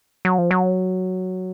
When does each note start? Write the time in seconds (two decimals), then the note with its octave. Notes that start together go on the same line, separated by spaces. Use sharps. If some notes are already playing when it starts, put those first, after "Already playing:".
0.25 F#3
0.38 F3
0.51 F#3